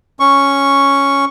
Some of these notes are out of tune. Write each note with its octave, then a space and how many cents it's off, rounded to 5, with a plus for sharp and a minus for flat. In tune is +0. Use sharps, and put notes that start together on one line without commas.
C#4 +0 C#6 +0